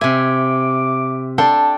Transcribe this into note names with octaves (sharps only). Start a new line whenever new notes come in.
C3 E5 G#5 D6
D4 A4 G5 A5 C6